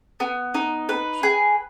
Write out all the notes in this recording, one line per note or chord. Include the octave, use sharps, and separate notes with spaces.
B3
D#4
B4
G#4